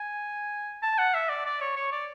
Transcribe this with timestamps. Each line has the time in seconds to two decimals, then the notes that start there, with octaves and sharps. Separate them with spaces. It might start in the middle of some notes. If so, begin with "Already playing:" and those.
Already playing: G#5
0.83 A5
0.98 F#5
1.15 E5
1.29 D5
1.46 D5
1.61 C#5
1.77 C#5
1.92 D5